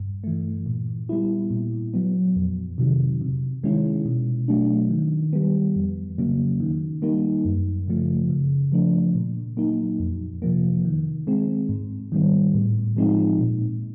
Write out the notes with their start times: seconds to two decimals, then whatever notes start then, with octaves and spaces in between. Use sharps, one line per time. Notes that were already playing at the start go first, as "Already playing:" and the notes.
Already playing: G2
0.24 E3 A3
0.66 A#2
1.09 G3 B3 E4
1.51 A#2
1.94 F#3 B3
2.36 F2
2.78 C3 D#3 F#3
3.21 C3
3.64 D#3 G#3 C#4 E4
4.05 B2
4.48 F#3 A3 D4
4.90 D#3
5.33 G3 B3
5.76 F2
6.18 C#3 F#3 A#3
6.60 D#3
7.02 G3 A#3 D#4
7.45 F#2
7.88 C#3 F3 A3
8.29 C#3
8.72 F3 A3 D4
9.15 A#2
9.57 F#3 A#3 D#4
10.00 F2
10.42 C3 F3 A#3
10.85 D#3
11.27 G#3 C4
11.69 G#2
12.12 D#3 G3 B3
12.55 A2
12.97 F3 G#3 C4 D#4
13.39 A#2